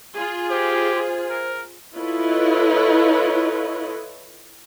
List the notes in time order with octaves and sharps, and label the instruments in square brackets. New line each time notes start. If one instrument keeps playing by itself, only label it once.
[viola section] F4 G#4
[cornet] G4 [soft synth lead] C5
[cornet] A#4
[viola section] E4 F4 A4 B4 C#5 D#5